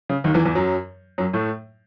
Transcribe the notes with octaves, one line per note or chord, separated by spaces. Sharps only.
C#3
D#2 D#3
E2 E3
E2 E3
F#2 F#3
F#2 F#3
A2 A3